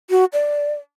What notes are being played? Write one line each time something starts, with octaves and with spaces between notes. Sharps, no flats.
F#4
D5